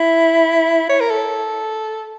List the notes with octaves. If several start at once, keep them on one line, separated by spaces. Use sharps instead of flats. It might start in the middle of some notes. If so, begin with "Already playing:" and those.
Already playing: E4
C#5
A#4
A4